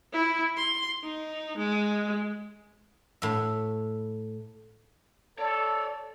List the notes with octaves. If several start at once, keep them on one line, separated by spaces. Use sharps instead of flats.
E4
C6
D#4
G#3
A2 E5
A4 C#5 D5